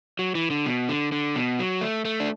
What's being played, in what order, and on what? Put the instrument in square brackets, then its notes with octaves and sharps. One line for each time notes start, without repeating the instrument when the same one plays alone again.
[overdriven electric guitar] F#3
E3
D3
B2
D3
D3
B2
F#3
A3
A3
D4